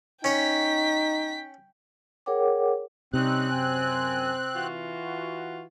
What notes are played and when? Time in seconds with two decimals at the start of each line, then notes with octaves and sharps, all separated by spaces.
0.24 C#4 D#4 C#5 G5 B6
2.26 G#4 A#4 C#5 F#5 G5 D6
3.13 C3 G3 C4 C#4 D#4 F#6
3.50 F#2 G#5
4.54 E3 F4 F#4